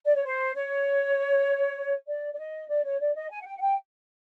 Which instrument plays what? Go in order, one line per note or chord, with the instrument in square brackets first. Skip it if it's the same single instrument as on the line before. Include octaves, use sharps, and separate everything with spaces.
[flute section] D5
C#5
C5
C#5
D5
D5
D#5
D5
C#5
D5
D#5
G#5
F#5
G5
F#5
G5